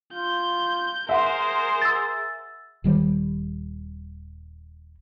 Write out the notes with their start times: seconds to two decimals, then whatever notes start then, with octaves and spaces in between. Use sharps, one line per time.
0.14 F4 G6
1.09 G#4 A#4 C5 E5 F#5 C6
1.82 E6 A6
2.84 D#1 D#3 G3